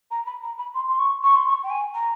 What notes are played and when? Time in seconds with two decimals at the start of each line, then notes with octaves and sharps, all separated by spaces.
0.11 A#5
0.26 B5
0.42 A#5
0.58 B5
0.74 C6
0.87 C6
0.98 C#6
1.23 C#6
1.35 C6
1.46 C#6
1.63 G5
1.70 G#5
1.94 A#5